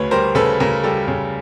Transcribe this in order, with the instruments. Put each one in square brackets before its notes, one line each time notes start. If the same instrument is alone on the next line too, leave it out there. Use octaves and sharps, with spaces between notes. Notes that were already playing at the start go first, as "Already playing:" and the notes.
Already playing: [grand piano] D2 C#3 B4 C#5
G3 A#4 C5
C#3 A4 B4
C#3 A#4
G3 A4
C#3